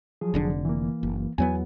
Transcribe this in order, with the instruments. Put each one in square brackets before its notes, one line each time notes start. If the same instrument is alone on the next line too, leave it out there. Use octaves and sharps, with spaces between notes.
[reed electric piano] F3 F#3 G#4
[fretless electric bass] F1 D3 D4
[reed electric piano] E3 A#3
[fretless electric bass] F#1
[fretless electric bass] E2 F#3 B3 [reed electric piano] G#5